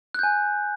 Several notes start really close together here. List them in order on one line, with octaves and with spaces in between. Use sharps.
F#6 G6 G#5